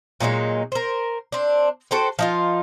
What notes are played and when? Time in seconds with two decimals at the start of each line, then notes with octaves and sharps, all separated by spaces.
0.20 A#2 F#3 G#3 D#4
0.72 A#4 C5
1.32 C4 D4
1.91 F#4 A4 C5 G5
2.19 F3 D#4 F4